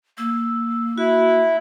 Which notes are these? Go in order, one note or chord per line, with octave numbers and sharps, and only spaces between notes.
A#3 E6
E4 F#4